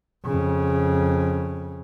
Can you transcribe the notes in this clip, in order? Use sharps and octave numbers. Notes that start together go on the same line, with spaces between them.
F2 C#3